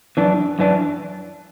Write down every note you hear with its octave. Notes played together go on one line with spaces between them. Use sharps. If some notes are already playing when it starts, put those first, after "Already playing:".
F#2 E3 D4
F#2 E3 D4